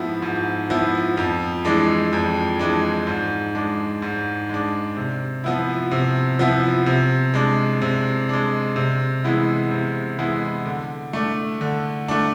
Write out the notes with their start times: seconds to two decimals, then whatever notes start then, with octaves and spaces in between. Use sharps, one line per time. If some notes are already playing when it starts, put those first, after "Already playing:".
Already playing: G#2 F3 B3 E4
0.22 G#2
0.70 F3 B3 E4
1.17 F2
1.65 E3 G#3 D4
2.13 F2
2.59 E3 G#3 D4
3.07 G#2
3.55 G#3 D4
4.02 G#2
4.49 G#3 D4
4.97 C3
5.44 F3 B3 E4
5.91 C3
6.39 F3 B3 E4
6.86 C3
7.34 G#3 D4
7.82 C3
8.29 G#3 D4
8.76 C3
9.24 E3 G#3 B3 E4
9.71 C3
10.19 E3 G#3 B3 E4
10.66 D3
11.13 A3 D4
11.61 D3
12.08 A3 D4